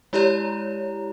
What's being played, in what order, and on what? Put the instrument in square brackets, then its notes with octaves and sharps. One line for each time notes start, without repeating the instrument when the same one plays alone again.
[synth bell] G#3 E4 G4 C#5 D5 A#5